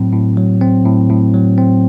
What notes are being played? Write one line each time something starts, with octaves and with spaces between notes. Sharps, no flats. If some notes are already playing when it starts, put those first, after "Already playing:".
Already playing: A2 F#3 C4
A2
F#3
C4
A2
A2
F#3
C4